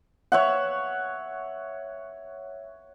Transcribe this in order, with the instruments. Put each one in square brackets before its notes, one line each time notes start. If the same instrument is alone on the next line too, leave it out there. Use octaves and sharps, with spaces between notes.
[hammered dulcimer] C#5 E5 F#5